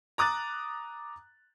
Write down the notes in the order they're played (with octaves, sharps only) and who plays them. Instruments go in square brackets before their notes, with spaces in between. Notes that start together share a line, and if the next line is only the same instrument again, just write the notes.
[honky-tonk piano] A#5 D6 D#6 F#6 A6